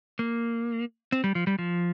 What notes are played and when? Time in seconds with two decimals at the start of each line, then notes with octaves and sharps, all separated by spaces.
0.19 A#3
1.12 C4
1.24 G3
1.35 F3
1.47 G3
1.59 F3